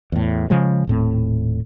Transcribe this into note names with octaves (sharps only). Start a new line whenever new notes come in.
E2 A2
C#3 F3 G#3
D#1 A2 C4